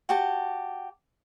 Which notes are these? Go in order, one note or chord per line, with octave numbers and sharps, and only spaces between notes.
F#4 G4 A5